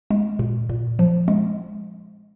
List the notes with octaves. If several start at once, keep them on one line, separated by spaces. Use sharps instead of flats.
G#3
A#2
A#2
F3
G#3